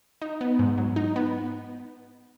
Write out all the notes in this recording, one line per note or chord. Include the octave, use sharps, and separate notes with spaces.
D#4
B3
G#2
F#3
D#4
B3